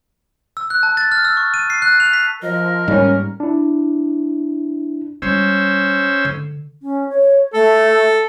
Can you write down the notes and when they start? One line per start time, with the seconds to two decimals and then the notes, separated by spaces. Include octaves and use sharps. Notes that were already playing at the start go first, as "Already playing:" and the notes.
0.57 E6
0.70 F#6
0.83 A5
0.97 A6
1.12 F6
1.25 E6
1.37 C#6
1.54 D#7
1.70 C7
1.82 F#6
2.00 F7
2.13 B6
2.42 F3 A#4 D#5
2.88 G#2 D#3 G3 A#3 C#4
3.40 D4 E4
5.22 G3 C#4 F4 C5 E6
6.25 D3
6.82 C#4
7.09 C#5
7.54 A3 A4